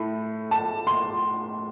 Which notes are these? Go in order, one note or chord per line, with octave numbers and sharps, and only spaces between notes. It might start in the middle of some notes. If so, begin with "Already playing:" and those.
Already playing: A2 A3
A5
C6